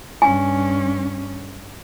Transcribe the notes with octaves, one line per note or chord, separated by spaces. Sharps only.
G2 C#4 G#5